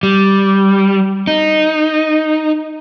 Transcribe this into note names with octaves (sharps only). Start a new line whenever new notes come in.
G3
D#4